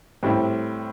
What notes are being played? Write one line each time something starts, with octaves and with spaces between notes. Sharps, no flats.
A2 G3 C4 E4